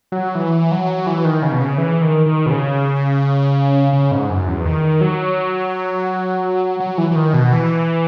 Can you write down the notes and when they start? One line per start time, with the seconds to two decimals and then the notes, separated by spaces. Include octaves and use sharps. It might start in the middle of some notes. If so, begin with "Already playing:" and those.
0.12 F#3
0.35 E3
0.72 F#3
1.07 E3
1.25 D#3
1.42 C#3
1.52 B2
1.61 C#3
1.78 E3
2.02 D#3
2.26 D#3
2.46 B2
2.50 C#3
3.93 C#3
4.12 G#2
4.30 F#2
4.48 E2
4.66 D#3
5.01 F#3
6.80 F#3
6.98 E3
7.11 E3
7.16 D#3
7.34 B2
7.52 E3